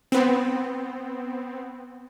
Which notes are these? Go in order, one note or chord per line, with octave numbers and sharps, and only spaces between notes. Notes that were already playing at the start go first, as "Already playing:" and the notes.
B3 C4